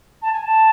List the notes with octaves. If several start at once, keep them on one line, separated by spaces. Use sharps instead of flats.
A5
G#5
A5